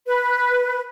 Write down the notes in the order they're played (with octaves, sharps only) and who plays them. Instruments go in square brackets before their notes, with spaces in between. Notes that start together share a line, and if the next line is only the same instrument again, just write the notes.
[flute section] B4